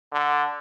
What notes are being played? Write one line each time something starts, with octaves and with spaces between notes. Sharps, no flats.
D3